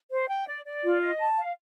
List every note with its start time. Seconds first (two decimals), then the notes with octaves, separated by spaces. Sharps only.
0.10 C5
0.29 G5
0.47 D5
0.65 D5
0.83 F4
1.01 D#5
1.20 A5
1.38 F5